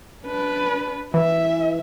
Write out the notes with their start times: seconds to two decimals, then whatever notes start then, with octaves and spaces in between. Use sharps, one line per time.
0.24 D4 B4
1.14 E3 E5